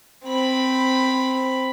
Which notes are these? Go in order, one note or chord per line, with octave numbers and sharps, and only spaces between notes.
C4 B5